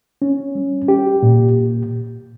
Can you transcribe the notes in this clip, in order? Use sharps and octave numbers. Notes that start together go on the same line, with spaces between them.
C#4
G3
G4
A#2